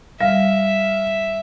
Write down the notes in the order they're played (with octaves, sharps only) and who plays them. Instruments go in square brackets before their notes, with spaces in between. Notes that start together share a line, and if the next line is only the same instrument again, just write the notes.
[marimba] G3 [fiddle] E5 [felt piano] F5